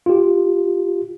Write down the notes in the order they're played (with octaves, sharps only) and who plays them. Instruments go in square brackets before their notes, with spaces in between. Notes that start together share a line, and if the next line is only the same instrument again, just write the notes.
[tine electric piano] F4 G4